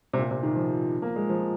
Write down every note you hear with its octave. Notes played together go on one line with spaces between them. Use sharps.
C3
A#2
C3
D#3
F3
A#3
G#3
F3